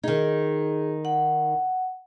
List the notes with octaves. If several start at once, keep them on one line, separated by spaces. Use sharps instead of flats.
D#3 D#4 G#4
F#5